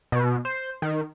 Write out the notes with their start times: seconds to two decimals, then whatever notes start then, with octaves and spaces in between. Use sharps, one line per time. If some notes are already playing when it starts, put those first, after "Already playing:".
0.12 B2
0.45 C5
0.82 D#3